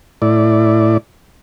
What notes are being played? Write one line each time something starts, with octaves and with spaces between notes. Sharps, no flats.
A2 E4 D5